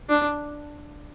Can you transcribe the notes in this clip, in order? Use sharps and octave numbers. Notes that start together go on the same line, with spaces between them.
D4